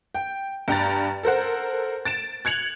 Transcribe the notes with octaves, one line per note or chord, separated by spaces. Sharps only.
G5
G2 G5 A#5 A6
A4 A#4 C5 F#5
A6 D7 E7
F#6 G#6 C#7 F7 F#7